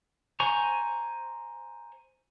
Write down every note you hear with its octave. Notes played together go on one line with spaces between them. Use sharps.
C5 G#5 A#5 C#6